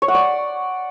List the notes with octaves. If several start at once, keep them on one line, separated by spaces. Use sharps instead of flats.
C#5
F#5
D5